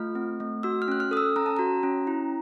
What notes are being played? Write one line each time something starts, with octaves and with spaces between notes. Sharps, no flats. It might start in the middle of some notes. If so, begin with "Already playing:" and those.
Already playing: A3 F4 F6
C4
A3
F#4 E6
F6
C#4 F#6
F6
A4 D#6
E6
C#4 A#5
A5
F#4 A#5
C#4
E4